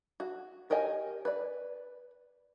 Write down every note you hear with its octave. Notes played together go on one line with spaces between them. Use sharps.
F#4
G4 A#4 C#5 D#5 G#5
B4 D5